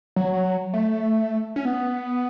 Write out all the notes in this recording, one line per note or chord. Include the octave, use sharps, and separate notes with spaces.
F#3
A3
C#4
B3